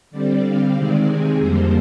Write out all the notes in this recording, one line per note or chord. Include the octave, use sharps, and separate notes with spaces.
D3 G3 C4 D5
F5
C3 D#3 G#3 C4 D5
G#4
F2 D3 G3 A#3 C5